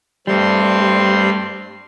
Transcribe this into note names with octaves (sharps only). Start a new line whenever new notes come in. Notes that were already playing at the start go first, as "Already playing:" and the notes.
G2 G3 A3 C4 C6